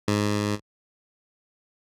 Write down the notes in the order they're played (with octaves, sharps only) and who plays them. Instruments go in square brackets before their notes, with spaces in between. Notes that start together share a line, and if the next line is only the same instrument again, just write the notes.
[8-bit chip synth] G#2